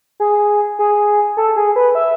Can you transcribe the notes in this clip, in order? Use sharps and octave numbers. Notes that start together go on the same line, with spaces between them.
G#4
G#4
A4
G#4
B4
E5